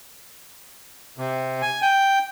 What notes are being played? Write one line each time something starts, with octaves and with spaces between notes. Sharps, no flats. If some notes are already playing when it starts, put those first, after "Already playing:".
C3
G#5
G5